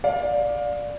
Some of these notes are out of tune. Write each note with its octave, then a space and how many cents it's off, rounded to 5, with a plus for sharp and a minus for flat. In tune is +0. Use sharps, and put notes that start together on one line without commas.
D5 +0 F5 +25